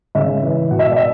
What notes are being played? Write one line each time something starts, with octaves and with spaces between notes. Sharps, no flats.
C#3 E5
E3
B2 F#5
E5
D5
E5